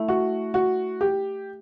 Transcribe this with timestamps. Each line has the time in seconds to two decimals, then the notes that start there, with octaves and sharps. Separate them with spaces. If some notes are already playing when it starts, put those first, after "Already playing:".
Already playing: A3 E4
0.08 F#4
0.54 F#4
1.01 G4